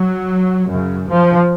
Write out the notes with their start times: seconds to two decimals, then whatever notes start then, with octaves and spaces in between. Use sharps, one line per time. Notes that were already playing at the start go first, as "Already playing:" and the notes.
Already playing: F#3
0.69 F#2 C#3
1.07 F3